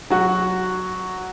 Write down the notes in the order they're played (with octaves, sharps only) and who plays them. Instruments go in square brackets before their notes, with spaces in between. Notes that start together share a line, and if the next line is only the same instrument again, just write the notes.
[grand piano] F#3 F#4